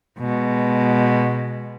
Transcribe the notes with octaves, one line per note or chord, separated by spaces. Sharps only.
B2 G#3